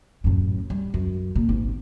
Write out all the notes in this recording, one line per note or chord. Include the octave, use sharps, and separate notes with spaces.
F#2 A2
G3
F#2
A#2
G#1